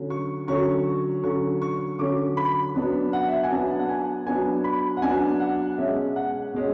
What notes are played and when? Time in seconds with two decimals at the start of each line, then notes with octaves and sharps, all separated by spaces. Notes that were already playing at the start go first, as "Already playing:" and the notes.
Already playing: D3 F#3 C#4
0.10 C#6
0.47 D3 F#3 C#4 C#6
1.24 D3 F#3 C#4 C#6
1.62 C#6
1.99 D3 F#3 C#4 D6
2.37 B5
2.75 F#3 B3 D4
3.13 F#5
3.28 E5
3.36 F#5
3.43 G#5
3.51 F#3 B3 D4 A5
3.79 F#5
3.89 G#5
4.26 F#3 B3 D4 G#5
4.64 B5
4.97 F#5
5.02 F#3 B3 D4 G#5
5.40 F#5
5.78 B2 G#3 C#4 E5
6.16 F#5
6.54 B2 G#3 C#4